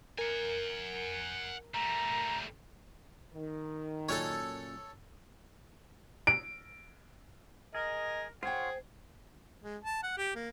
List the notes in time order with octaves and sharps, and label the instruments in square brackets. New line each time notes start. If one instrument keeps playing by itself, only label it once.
[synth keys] A#4 [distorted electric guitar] F#5 G#5
[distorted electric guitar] G3 A3 [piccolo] A#5
[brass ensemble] D#3
[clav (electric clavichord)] F#2 A#2 C#4 [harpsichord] A4 C#5
[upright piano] D7
[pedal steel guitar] G#4 [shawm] A#4 [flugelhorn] D#5
[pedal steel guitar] F4 C#5 [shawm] G#4 [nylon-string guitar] C5 G5 [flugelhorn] F#5
[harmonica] G#3
A5
F#5
G4
A#3